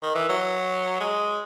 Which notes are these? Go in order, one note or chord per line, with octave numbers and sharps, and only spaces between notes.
D#3
E3
F#3
G#3